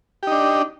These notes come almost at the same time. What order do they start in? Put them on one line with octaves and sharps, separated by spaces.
G4 D#4 D4